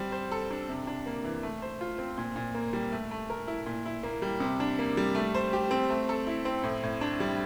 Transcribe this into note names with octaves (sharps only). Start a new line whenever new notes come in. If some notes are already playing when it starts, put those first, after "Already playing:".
Already playing: G3 C4
C5
A4
D4
C3
D4
A#3
E3
A3
C5
F4
C4
A#2
A#2
A#3
G3
A3
A3
A#4
E4
A#2
E4
A#3
G3
C3
D4
A#3
G3
A3
C5
G4
C4
A3
A4
E4
C4
A2
A2
D4
G3